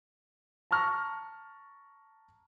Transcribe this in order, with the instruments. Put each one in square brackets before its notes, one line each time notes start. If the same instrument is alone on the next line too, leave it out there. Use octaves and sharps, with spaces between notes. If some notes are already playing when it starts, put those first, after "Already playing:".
[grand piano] A5 A#5 C#6 F6 A#6